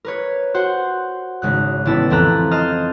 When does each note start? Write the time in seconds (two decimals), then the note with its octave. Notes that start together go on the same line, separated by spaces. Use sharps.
0.05 A#4 B4 C#5
0.54 F#4 C5 F#5
1.42 G#1 C#3 F#6
1.85 A1 D3 B3 C#4 E4 A5
2.10 F2 E3 C4 A4 A#5 F#6
2.51 C5 D#5 A5 C6 F6